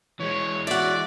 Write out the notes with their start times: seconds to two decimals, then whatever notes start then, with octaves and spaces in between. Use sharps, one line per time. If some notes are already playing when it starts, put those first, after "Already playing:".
0.20 E3 G#3 C#5
0.67 F#4 D5 E5